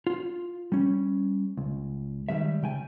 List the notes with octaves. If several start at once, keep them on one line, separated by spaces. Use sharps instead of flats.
F4
G3 C#4
C#2
D#3 G3 G#3 E5
C#3 G5 G#5